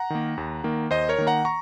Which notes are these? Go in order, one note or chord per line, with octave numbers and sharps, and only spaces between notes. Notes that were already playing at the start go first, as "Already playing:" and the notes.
Already playing: F#5 A#5
D#3 A#3
D#2
D#3 A#3
D#2 C5 D#5
A#4 C#5
D#3 A#3
F#5 A#5
A#5 C#6